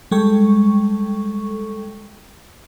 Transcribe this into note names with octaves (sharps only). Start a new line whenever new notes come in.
G3 G#3 A4 G5 C#6